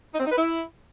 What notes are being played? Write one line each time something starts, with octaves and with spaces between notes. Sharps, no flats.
D#4
C4
D#4
B4
E4